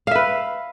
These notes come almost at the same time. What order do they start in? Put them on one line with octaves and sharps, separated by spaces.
F5 E5 B4